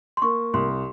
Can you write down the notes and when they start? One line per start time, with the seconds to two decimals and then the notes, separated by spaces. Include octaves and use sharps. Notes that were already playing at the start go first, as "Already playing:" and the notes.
0.17 C6
0.22 A#3 C#6
0.53 C2 C6